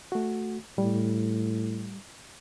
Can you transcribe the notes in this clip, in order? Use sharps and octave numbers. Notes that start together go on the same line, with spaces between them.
A3 F#4
A2 G3